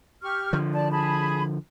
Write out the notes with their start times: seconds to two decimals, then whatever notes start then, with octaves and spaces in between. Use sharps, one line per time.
0.22 G4 C#6 F6
0.53 D3 F3
0.73 D5 A5
0.92 G#4 A5 B5